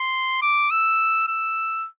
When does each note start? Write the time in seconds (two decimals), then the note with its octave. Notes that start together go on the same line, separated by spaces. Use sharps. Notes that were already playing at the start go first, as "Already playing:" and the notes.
Already playing: C6
0.42 D6
0.71 E6
1.28 E6